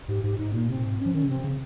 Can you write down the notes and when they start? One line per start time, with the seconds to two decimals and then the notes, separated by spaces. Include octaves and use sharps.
0.08 G#2 G4
0.24 G#2 G4
0.38 G#2 D#4
0.54 A#2 A#3
0.69 C3 C4
0.78 A#2
0.85 G#2
0.99 C#4
1.06 F3
1.14 D#3 C#4
1.23 C#3
1.29 C3 C4
1.44 C#3